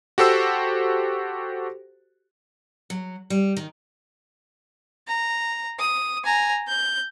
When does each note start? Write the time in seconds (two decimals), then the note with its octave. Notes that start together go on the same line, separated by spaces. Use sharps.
0.18 F#4 G4 A4 C5 E6
2.90 F#3
3.30 G3
3.57 D#3
5.08 A#5
5.79 D#6
6.24 G#5 A#5
6.68 G6